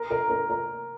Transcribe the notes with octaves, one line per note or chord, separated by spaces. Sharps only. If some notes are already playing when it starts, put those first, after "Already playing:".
Already playing: A#4
A#4
A#4
A#4